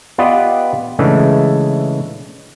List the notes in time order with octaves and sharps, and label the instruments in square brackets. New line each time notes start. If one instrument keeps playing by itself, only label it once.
[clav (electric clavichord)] B3 F4 G4 B4 D5 D#5
C#3 E3 G#3 A3 D4